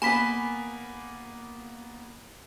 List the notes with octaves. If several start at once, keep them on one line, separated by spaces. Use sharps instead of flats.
A#3 B3 G#5 B5 B6